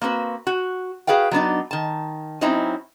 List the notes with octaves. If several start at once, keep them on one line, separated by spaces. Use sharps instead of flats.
A#3 C4 F#4 B4
F#4
F#4 G#4 B4 F5 G5
F#3 B3 D4 D#4
D#3 A5
F#3 C4 C#4 D#4 E4